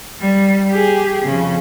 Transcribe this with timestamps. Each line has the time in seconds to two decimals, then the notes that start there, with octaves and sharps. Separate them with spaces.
0.20 G3
0.71 G4 G#4
1.25 F2 C#3